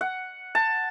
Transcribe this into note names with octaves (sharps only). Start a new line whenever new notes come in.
F#5
A5